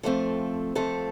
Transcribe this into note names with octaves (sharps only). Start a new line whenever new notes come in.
F2 F3 A3 C4 A4
F2 F3 A3 C4 A4